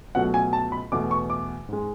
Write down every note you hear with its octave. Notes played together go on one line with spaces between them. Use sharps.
C#2 B2 F#3 A3 F#5
G#5
A5
B5
E2 B2 A3 D6
C#6
D6
G#2 G#3